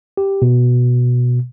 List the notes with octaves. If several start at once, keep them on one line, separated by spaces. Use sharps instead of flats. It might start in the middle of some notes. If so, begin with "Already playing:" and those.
G4
B2